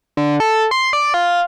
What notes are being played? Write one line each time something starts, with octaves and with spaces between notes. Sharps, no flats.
D3
A4
C6
D5
F4